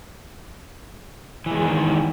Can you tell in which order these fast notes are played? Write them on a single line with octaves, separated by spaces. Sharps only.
E3 G#3 G#4 D#3